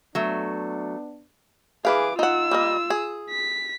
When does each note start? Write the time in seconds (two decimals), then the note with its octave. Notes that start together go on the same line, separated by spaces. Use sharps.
0.15 F#3 A3 B3 D4
1.85 E3 G#4 B4 F5 D6
2.19 D#4 F4 F#5 E6
2.51 G3 A#3 D#5
2.90 G#4
3.30 B6